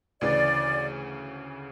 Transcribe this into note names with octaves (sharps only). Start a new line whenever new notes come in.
D2 C#3 E3 D5